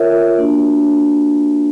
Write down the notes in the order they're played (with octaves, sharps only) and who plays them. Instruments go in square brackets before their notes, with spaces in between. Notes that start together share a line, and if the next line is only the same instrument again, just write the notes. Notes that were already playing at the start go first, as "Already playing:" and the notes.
Already playing: [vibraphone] F4 A#4 C#5 E5
A#3 D4 F#4